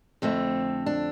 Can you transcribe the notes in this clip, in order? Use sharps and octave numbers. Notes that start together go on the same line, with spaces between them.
F2 D3 A3 C4
D4